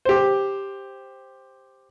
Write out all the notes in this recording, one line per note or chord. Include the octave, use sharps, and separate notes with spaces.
G4 C5